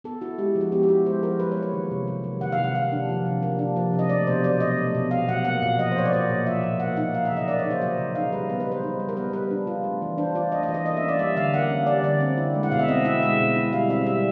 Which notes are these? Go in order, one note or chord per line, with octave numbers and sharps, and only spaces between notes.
B3 A4
E4 F#4
G#3 G4
F3
F#4
B3 G4
G4
E4 F#4
G#3 C5
F3 A#4
F#3 B4
C#5
A#3
C#5
D#3
C3
F#3
A#3
D#3 F#5
F5
C3
F#5
A#3 F5
D4
F3
C3
A#3
D4
F3
C3
D#5
A3 D5
B2 C5
F#3 D5
B2 D#5
A3
B2
F#3 F5
B2 F#5
A#3 F#5
A#2 F5
F3 D#5
C5
A#2 C#5
D5
A#3 D#5
A#2
F3 E5
A#2
A#3 F#5
D#4 F#5
F#3 F5
E5
C#3
D#5
A#3 D5
C#5
D#4
C5
F#3 D#5
C#3
D#4 F5
G3 B4
B3 B4
B4
G3
C5
D#4
G3
A#4
B3 B4
G3 B4
D4
F4
A3
E3
D4 C5
F4 D5
A3 D#5
D#5
E3
D#5
A#3 D#5
E5
C#4
D5
G3 E5
D3 F5
A#3 F#5
C#4
G3 D5
D3 D5
C4
E4
G#3
F#5
B2 F5
E5
C4 D#5
E4 E5
G#3 E5
B2
E4
G3 F5
C4 E5
G3 E5